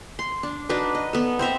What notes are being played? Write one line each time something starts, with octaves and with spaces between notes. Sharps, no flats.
C6
D4
D4 D#4 F#4 B4
D#5
B3 A4
C4 C5 E5 A#5